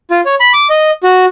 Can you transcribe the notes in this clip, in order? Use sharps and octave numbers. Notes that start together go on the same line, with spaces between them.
F4
C#5
B5
D6
D#5
F#4